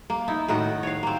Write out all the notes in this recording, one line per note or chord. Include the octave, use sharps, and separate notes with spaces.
A#3
D#4 E4
A2 D#3 F#4
C#5 F5
A#3 C4